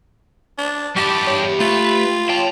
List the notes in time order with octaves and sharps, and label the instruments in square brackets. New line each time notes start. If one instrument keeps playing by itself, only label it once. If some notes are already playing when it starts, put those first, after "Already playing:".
[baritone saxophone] D4
[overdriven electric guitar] G3 A5 [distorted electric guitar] B3 E4 [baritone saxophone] G4
[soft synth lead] C#5
G4
[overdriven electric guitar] A3 [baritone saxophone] F4 [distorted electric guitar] B4
[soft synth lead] C#5 [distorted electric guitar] G5 [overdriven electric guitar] A5 C6